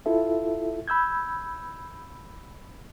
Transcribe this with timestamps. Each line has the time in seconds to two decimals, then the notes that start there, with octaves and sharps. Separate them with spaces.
0.06 E4 F4 A4 E5
0.88 B5 E6 G6 G#6